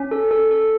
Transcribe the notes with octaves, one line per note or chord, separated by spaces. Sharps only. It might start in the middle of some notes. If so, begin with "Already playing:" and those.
Already playing: C#4
A4
A4
A4